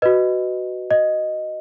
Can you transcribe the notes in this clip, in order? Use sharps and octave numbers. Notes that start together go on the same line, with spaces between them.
F#4 B4 D#5
D#5